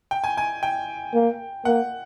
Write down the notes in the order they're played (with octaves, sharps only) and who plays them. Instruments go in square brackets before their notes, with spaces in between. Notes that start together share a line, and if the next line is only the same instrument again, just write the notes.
[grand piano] G5
G#5
G#5
G5
[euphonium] A#3
[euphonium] A#3 [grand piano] F#5